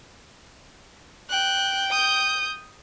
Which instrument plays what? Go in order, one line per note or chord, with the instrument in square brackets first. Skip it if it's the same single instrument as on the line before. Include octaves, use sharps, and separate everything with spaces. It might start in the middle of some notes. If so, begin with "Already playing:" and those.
[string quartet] G5 [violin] F#6
[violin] D#6 G6